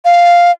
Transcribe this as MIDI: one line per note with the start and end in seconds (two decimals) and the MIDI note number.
0.05 0.52 77